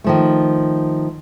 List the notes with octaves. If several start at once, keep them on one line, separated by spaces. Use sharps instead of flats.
D#3 F3 A3